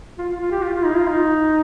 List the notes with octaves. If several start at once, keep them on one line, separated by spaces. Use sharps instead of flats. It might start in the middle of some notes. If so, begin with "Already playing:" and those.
F4
F4
F4
G4
F4
F4
D#4
F4
D#4